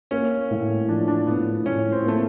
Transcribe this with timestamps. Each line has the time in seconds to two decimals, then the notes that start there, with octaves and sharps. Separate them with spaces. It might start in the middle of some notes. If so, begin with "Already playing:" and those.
0.11 A#3 C#4
0.51 A2
0.89 F3 D4
1.08 D4
1.27 A2 B3
1.65 A2 C#4
1.92 C4
2.04 A3 A#3